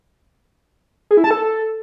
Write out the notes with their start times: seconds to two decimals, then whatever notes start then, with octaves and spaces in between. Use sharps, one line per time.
1.11 G#4
1.17 E4
1.24 A5
1.31 A4